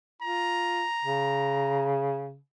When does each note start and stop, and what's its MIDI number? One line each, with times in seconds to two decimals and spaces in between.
0.22 0.84 65
0.22 1.94 82
1.04 2.37 49